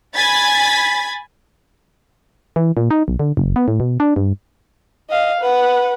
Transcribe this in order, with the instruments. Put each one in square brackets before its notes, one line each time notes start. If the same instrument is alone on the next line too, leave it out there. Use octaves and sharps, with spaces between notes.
[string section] G#5 B5 G#6 A6 B6
[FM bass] E3
A#2
D#4
B1
D3
F#1
B3
A2
B2
D4
G2
[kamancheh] D#5 F5
B4 F#5